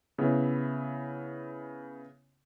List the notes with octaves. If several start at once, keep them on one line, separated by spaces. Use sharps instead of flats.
C#3 B3 E4